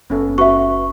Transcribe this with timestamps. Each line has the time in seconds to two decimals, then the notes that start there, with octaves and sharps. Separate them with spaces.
0.10 F#1 B3 C#4 A4
0.38 F#4 B4 E5 C#6